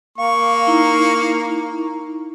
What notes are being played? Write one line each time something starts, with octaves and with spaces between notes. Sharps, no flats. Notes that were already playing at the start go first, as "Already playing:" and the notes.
A#3 F5 C#6
D#4 E4 A#5